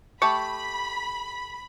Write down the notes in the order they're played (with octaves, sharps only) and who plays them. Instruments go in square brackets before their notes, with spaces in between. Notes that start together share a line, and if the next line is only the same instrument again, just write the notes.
[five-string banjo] A3 G4 A5 [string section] B5 [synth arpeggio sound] C#6